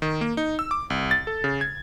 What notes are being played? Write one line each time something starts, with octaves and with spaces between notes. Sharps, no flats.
D#3
A#3
D#4
E6
D6
C2
A6
A4
C#3
G#6